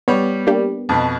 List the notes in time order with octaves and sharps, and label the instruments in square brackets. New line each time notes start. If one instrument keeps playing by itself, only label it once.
[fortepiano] G3 C#5 [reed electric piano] B3
[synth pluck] A#3 D4 G4
[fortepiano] F2 B2